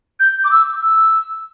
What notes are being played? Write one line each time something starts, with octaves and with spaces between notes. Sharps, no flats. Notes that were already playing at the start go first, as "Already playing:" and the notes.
G6
D6
E6
E6